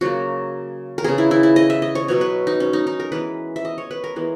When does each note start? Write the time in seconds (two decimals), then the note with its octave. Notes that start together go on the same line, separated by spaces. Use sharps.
0.01 C#3 F#3 A#3 F#4
0.98 A#4
1.04 C#3 G#3 B3 G#4
1.18 E4
1.31 E4
1.43 E4
1.56 D#5
1.70 E5
1.82 D#5
1.95 C#5
2.08 B2 F#3 B3 C#5
2.21 B4
2.47 D#4
2.60 C#4
2.73 D#4
2.87 D#4
3.00 A#4
3.12 E3 G#3 B3 B4
3.56 E5
3.65 D#5
3.78 C#5
3.91 B4
4.04 A#4
4.16 E3 G#3 B3